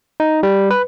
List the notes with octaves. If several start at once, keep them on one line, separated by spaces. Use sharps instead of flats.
D#4
G3
B4